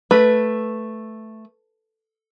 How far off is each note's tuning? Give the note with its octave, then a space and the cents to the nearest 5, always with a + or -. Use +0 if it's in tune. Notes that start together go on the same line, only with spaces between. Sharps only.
A3 +0 B4 +0